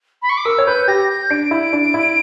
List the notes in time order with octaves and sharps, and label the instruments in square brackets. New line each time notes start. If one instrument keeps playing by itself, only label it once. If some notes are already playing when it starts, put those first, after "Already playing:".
[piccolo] B5
C#6
D6
[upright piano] A#4 [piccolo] E6
[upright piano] C#5
[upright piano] B4 [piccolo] G6
[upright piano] G4 [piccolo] A#6
[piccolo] G6
[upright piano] D4 [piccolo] D7
[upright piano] E4
D4
E4